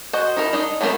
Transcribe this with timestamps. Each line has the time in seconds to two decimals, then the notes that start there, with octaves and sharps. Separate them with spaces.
0.13 F#4 C5 D#5
0.37 D#4 E4 A#4
0.53 D4 D#4 D#5
0.81 F#3 A3 B3 C4 A#4